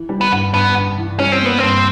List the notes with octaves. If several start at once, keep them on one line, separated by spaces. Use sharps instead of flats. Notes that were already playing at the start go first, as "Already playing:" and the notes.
Already playing: E3
G3
B3
G2
G2 B3
G2
E3
G3 C#4
C4
A#3 B3
G2 C4